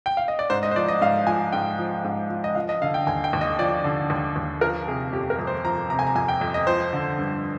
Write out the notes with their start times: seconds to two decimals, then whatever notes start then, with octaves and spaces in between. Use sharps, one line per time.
0.06 G5
0.17 F5
0.28 D#5
0.39 D5
0.50 G#2 C5
0.63 D#5
0.71 C5
0.76 F3 D5
0.88 D#5
1.01 G#2 F5
1.27 F3 G#5
1.53 G#2 G5
1.79 F3
2.04 G#2
2.30 F3
2.44 D#5
2.55 F3 F5
2.69 D#5
2.82 D3 F5
2.94 G5
3.07 D#2 G#5
3.24 G5
3.33 D#2
3.41 D#5
3.59 F3 D5
3.84 D3
4.10 D#2
4.36 D#2
4.61 F3 A#4
4.87 C3 G#4
5.13 F2 G4
5.30 A#4
5.39 F2
5.47 C5
5.65 F3 A#5
5.90 C3 A#5
5.99 G#5
6.07 A#5
6.15 F2 G#5
6.28 G5
6.41 F2
6.54 D#5
6.67 F3 C5
6.93 D3
7.18 G2